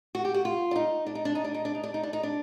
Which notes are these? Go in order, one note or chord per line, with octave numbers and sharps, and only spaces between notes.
F#4
G4
F#4
F4
D4
D#4
D4
D#4
D4
D#4
D4
D#4
D4
D#4
D4
D#4
D4
D#4
D4